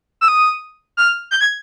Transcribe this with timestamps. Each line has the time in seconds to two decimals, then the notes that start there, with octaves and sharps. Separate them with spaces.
0.21 E6
0.28 D#6
0.97 F6
1.31 G6
1.41 G#6